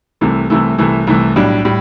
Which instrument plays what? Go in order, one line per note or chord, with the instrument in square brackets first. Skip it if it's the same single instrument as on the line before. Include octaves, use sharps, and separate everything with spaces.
[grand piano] C2 C3 E3 A3
C2 C3 E3 A3
C2 C3 E3 A3
C2 C3 E3 A3
B1 A2 G3 D4
A2 G3